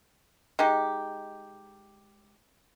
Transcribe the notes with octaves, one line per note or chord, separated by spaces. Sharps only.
G#3 D#4 G4